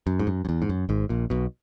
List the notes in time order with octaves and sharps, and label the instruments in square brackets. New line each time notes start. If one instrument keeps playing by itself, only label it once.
[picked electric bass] F#2
G#2
F#2
F#2
E2
G#2
F#2
G#1 G#2
A#1 A#2
B1 B2